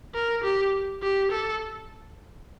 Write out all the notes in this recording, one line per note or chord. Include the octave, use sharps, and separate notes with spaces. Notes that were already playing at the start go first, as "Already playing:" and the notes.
A#4
G4
G4
A4